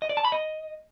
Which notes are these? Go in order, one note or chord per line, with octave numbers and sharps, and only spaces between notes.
D#5
D5
A5
B5
D#5